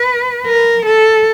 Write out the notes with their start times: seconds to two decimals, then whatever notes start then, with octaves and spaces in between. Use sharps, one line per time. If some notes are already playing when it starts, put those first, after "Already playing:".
Already playing: B4
0.46 A#4
0.86 A4